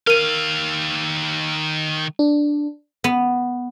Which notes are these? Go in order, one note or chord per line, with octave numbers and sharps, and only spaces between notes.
D#3 A#4 F5 D#7
D4
B3